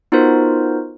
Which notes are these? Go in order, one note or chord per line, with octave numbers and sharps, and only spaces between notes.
B3 D#4 F4 F#4 A#4 C5